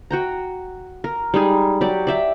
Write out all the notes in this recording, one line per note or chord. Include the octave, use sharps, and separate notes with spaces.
F#4 G5 A#5
A#4
G3 G#3 D#4 G#4
F#3 G4 D5
D5 E5 G5